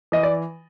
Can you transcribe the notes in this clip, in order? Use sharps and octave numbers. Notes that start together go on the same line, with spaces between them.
E3 D#5
D5